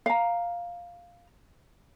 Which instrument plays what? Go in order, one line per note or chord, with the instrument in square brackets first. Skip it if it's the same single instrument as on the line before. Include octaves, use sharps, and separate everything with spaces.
[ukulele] F5 A#5